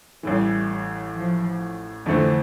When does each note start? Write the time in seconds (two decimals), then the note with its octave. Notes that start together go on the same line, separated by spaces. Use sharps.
0.23 A1 A2 E3 G3
1.14 F3
2.06 F2 D3 E3 A3 C4